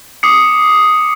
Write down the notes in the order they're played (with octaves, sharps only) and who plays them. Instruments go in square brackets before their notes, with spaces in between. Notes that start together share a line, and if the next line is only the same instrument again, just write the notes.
[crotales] D6 D#6 C7 C#7